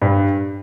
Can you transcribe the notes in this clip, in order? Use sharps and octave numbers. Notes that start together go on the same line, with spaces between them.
G2